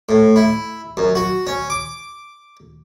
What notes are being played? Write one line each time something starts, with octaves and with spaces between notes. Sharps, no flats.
A2
E4
F#2
F#4
C#4
D6